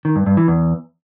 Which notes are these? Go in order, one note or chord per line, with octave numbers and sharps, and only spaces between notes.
D#3
G2
G2
E3
E2